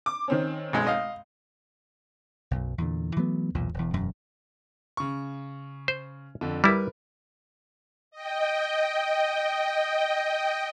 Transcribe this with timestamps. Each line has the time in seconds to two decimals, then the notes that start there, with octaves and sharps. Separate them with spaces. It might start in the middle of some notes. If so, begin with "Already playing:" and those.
0.06 D6
0.28 D#3 C4 C#4
0.73 B1 G#3
0.87 D#5 F5
2.51 B1 F#2
2.78 E2 A#2 D3
3.17 E3 F#3 A3 B3
3.54 B1 E2 A#2
3.74 E1 E2
3.93 E1 F#2
4.97 C#3 C#6
5.88 C5
6.41 F2 D3
6.64 G3 E4 A#4 B4
8.11 D#5 G5